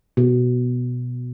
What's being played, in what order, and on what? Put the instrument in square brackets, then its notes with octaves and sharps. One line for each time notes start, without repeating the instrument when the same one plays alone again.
[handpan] B2